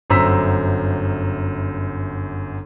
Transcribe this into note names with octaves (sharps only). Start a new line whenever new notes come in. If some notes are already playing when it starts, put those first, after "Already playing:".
G1 F#2 C5 A#5 E6 B6